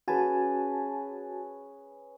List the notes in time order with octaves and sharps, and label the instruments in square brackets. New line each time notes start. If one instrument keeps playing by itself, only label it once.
[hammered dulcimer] C#4 G#4 B4 [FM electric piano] F#4 G#5 A5